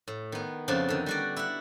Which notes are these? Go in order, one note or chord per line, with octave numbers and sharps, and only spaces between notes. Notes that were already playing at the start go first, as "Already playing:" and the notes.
A2
D#3 B3
F2 C#3 F3 D4
D3 D#3
G3 F#4 D5
E4 F#5